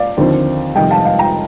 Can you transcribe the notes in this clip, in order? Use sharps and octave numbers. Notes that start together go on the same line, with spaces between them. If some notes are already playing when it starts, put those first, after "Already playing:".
Already playing: D5 F5
D#2 D3 F3 C4
F2 C3 D#3 G3 D#5 G5
F5 A5
F5 A5
G5 A#5